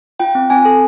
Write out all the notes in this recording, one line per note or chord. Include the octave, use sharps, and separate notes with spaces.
F4 G5
C4
C4 G#5
A4